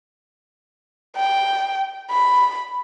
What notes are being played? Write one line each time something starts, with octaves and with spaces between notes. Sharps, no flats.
G5
B5